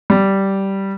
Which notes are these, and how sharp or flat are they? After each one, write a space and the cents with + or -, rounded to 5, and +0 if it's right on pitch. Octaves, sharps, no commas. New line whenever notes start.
G3 -10